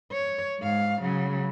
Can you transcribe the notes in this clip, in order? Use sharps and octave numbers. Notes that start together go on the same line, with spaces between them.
C#5
G#2 F5
C#3 F#3